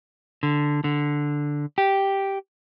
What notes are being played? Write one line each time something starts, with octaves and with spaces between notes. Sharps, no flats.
D3
D3
G4